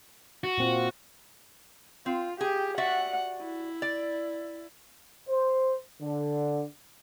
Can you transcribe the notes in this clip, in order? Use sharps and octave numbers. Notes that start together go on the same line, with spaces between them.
F#4
A#2 C4 F4
C4 F4
G4 G#4
F#4 D5 E5 F#5
E4
D5
C5
D3